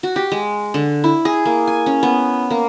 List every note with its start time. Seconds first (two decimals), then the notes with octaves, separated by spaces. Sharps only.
0.03 F#4
0.16 G4
0.32 G#3
0.74 D3
1.04 E4
1.25 G#4
1.45 A#3
1.68 G#5
1.86 C#4
2.03 B3
2.51 A#3